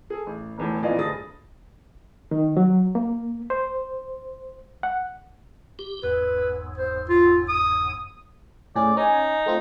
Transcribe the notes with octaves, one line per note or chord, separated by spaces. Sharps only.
G#4 A4
A1
E1 E2 A2
F2 A#2 E3 D5 D#5 F5
D2 G2 G#4 D#6 A6 A#6
D#3
F#3
A#3
C5
F#5
G4
F#1 E2 G#2 B4
C5
F4
D#6
A2 C#4 G#4 D5
C#4 D#4 G#5
A3 C4 F4